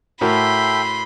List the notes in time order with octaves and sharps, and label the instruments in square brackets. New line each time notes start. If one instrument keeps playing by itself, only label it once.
[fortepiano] A2 F#4 A#4 [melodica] A4 E5 G5 [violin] B5 C6